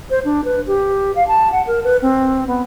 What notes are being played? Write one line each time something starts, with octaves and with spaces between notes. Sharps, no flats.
C5
D4
B4
G4
F5
A5
F#5
A#4
B4
C4
B3